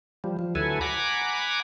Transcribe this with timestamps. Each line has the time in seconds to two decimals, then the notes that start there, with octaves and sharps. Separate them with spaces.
0.24 F3 G3
0.39 F3
0.55 D2 F#3 E4 A4 B4 G#5
0.81 F#5 G#5 A#5 B5 D6